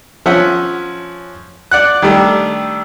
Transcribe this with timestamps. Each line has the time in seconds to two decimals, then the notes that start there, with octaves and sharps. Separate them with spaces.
0.26 F3 C#4 E5 F#5
1.71 D5 F#5 F#6
2.02 D#3 G3 A3 D4